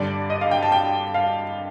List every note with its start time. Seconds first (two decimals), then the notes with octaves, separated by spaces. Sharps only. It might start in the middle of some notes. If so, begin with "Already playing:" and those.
Already playing: G2 D3 G3 D5
0.30 D#5
0.41 F5
0.51 G5
0.63 A5
0.72 G5
1.14 F5